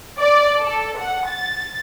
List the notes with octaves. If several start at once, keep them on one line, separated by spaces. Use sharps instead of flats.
D5
A4
F#5
A6